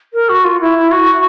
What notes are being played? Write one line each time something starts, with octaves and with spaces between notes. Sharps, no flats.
A#4
F#4
F4
E4
F#4